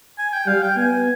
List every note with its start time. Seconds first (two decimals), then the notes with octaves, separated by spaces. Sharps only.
0.18 G#5
0.33 G5
0.47 G3 F5
0.62 G5
0.76 B3 G#5